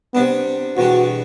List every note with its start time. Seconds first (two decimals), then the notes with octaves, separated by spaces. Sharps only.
0.14 C3 G3 B3 D4
0.77 E2 B2 G3 D4 F#4